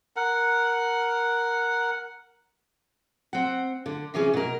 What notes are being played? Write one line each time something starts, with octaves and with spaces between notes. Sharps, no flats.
A#4 F#5
C4 F#5
D3
C3 E3 B3 C#4 G#4
B2 A#4